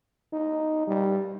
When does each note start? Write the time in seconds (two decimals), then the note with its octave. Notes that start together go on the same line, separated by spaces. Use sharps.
0.33 D#4
0.87 G3